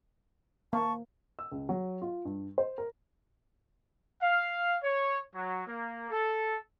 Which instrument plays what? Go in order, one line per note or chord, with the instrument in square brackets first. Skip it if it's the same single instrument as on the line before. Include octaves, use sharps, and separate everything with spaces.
[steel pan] A#3 [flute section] A5 C#6
[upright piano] E6
C#2
F#3
F4
G2
C5
A#4
[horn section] F5
C#5
F#3
A#3
A4